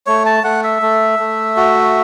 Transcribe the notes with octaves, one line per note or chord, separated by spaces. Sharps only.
A3 C#5
A5
A3 F#5
E5
A3
A3
F#4